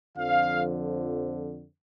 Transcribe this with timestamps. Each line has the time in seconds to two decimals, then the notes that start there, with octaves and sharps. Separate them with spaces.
0.17 F2 D3 F3 F5